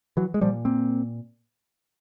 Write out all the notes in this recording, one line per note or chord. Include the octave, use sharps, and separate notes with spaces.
E3 F#3
G#3
A#2 F3 G3
A#3 C4